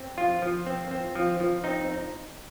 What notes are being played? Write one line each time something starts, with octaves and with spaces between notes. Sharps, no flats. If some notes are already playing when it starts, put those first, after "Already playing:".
Already playing: C4
F3 F4
F3
C4
C4
F3
F3
C4 D#4